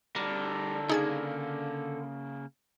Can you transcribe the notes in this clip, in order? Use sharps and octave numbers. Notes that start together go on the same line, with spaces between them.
D3 G3 A#4
C#3 A#3 D#4 G#4 G#6